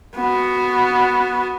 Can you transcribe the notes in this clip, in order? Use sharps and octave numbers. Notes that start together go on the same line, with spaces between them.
B3 F#4